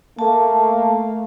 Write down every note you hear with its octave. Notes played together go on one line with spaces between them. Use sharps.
A3 A#3 A5